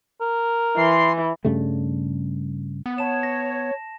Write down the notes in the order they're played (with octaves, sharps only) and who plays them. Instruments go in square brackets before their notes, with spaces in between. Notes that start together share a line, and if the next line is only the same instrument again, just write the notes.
[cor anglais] A#4
[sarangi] E3 [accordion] C6
[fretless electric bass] G2 C#3 G3 A3
[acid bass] B3
[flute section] C#5 [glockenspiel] A5 E7
[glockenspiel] A#6